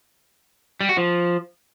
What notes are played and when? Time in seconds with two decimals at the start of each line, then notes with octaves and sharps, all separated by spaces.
0.81 G3
0.89 F#4
0.97 F3